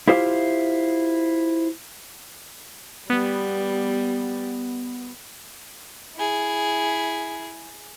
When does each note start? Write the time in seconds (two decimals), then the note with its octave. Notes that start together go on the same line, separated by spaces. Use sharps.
0.08 E4 F4 G4 C5 E5 F5
3.10 G3 B3
6.16 E4 G#4